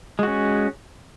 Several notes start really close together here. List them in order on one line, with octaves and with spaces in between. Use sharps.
G#3 F#4 C#4